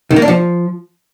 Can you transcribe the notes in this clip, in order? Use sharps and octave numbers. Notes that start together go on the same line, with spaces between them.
D#3
A#3
D4
F3